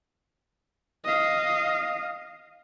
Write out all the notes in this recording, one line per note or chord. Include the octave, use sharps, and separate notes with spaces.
D#5 F5